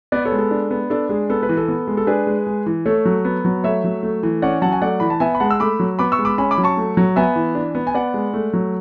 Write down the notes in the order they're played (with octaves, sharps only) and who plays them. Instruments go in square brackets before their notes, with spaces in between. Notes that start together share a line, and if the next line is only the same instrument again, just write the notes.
[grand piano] B3 B4 D5
A4 C#5
G#3
A4
D4
B3
D4 A4
G#3 G#4
B3 A4
B4
E3
A4
B3
G#3
A4
D4 G#4 B4
G#3
G#3
E3
A3 A4 C#5
F#3
B3
F#3
A3 C#5 E5
F#3
A3
E3
C#4 D5 F#5
F#3 F#5 A5
G#5
A3 D5 F#5
E3 B5
A5
B3 E5 G#5
B5
G#3 F#5 A5
E6
A3 B5 D6
F#3
B3 B5 D6
C#6 E6
G#3
B5 D6
C#4 G#5 B5
B5 D6
F#3
A5 C#6
A3
F#3
B3 E5 G#5
E3
D4
B3
G#5
B3 D5 F#5
G#3
A3
F#3